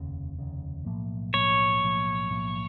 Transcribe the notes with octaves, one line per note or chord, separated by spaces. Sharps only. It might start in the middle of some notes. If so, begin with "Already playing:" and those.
Already playing: F1 D#2 C#3
F1 D#2 C#3
B1 A2 F3 A#3
B1 A2 F3 A#3 C#5
B1 A2 F3 A#3
B1 A2 F3 A#3